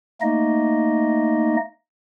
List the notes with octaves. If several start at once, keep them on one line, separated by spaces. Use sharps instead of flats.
A3 A#3 D#4 D#5